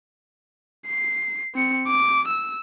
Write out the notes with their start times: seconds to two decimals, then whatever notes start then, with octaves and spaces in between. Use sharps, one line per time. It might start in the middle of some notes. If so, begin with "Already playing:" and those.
0.87 C7
1.54 C4 C#7
1.87 D6
2.28 E6